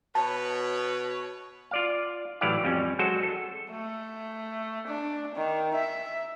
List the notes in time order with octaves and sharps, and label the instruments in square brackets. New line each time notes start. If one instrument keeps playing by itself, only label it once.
[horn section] B2 B4 [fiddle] C#5 [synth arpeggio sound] A5
[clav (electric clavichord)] F4 D5 F5
A2 E3 F#3 G4 D5 F5
F2 G3 C#4
F#3 G#3 F#4 A4 C5
A4
[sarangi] A3
D4
D#3
E5